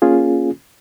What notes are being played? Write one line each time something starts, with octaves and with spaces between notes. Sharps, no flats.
A#3 C#4 F4 G#4